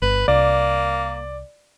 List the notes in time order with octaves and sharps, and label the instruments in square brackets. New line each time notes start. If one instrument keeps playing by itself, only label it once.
[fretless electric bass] G1 [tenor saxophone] B4
[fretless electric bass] C2 [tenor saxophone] A#3 [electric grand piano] D5